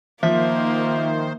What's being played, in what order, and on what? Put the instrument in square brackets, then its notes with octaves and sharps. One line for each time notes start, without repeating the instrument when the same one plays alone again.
[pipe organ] D#3 C5 [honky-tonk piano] F3 [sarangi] A#3 [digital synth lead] E5